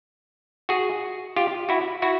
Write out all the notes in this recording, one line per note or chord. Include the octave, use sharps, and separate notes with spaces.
F#4 G#4
F4 G4
E4 F#4
E4 F#4